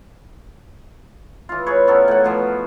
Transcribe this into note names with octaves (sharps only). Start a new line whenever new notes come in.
E3 F4
G#4 B4 C#5
B3 C#4 A4 A#4
A2 F#5
B2 F3 B3